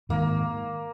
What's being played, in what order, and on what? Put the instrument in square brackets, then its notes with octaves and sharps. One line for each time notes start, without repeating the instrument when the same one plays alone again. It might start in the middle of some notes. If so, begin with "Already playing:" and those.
[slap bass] G#2 D#3 G#3 [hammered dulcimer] A#3